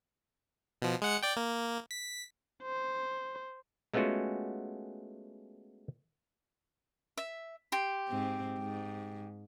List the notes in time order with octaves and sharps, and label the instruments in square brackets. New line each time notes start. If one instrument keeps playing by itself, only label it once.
[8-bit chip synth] B2 F3
G#3 F#5 C#7
D5 G5
A#3
B6
[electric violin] C5
[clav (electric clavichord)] G#3 A3 B3 C#4 F4 F#4
[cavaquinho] E5
G4 C6
[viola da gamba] G#2 C4
G#2